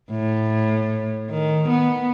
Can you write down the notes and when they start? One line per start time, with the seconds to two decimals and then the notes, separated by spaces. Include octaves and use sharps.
0.11 A2
1.31 D#3
1.69 B3